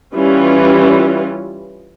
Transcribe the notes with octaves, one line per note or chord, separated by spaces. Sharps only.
E3 G3 C#4 F4